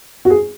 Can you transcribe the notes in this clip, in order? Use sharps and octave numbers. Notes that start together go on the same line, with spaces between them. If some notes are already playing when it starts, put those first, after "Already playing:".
F#4
G#4